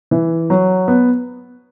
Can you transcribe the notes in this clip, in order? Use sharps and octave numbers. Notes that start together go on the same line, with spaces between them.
E3
F#3
B3